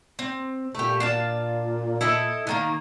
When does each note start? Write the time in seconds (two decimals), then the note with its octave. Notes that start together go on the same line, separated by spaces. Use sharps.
0.19 C4
0.75 A#2 A3 G4
1.00 D4 F4 A5
2.01 E4 A4 D#5
2.47 D3 D#3 A#3